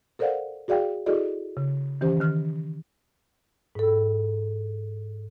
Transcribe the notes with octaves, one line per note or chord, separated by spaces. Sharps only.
A4 A#4 C5 D5 F5 F#5
F#4 G#4 D5 F5 G5
E4 F#4 G#4 A4 D5 D#5
C#3
D#3 E3 C#4 G4 C5
D#3 F6
G#2 A4